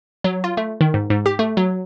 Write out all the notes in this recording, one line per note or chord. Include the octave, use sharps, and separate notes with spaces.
F#3
F4
A3
D#3
G#2
G#2
G4
A3
F#3